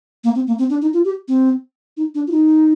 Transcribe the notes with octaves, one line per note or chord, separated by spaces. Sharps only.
A#3
C4
A#3
C4
D4
D#4
F4
G4
C4
D#4
D4
F4
D#4